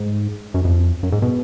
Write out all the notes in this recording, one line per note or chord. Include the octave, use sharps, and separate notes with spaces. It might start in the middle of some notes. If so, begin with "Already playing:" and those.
Already playing: G#2
F#2
F2
F#2
G#2
B2